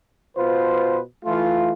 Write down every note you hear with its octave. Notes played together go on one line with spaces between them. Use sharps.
B2 F4 B4 C5
E3 A3 F4